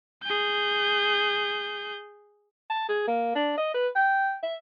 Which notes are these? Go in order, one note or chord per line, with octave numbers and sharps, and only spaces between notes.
G#4 G6
A5
G#4
A#3
D4
D#5
B4
G5
E5